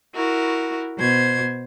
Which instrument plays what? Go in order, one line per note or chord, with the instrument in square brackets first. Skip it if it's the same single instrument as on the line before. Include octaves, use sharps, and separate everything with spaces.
[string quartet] E4 F#4 A#4
B2 C5 G#6